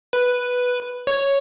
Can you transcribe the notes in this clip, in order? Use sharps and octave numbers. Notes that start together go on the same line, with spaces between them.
B4
C#5